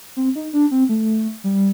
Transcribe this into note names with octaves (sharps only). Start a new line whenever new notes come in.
C4
D#4
D4
C4
A3
G3